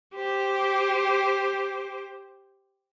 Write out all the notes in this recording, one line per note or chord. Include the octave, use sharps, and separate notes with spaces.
G4 C5